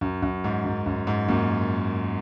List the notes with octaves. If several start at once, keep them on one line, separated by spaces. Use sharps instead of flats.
F#2
F#2
G#2
F#2
F#2
G#2
F#2 A#2